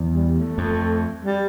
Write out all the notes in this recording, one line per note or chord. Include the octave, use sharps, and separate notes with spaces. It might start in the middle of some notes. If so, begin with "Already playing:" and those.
Already playing: E2
G3
A3
F2
G3